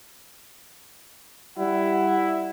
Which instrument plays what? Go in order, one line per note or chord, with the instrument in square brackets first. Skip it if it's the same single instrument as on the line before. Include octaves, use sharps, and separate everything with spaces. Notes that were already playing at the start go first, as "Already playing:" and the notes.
[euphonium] G3 [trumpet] E4 [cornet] F#5